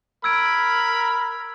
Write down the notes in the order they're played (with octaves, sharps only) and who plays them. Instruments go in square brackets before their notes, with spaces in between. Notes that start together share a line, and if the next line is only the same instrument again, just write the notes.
[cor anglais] A#4 [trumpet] B5 [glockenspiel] E6 G#6 D7